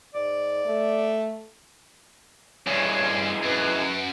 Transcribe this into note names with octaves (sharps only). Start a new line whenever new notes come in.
G#2 D5
A3
G2 E3 G#3 C#5
F#2 B4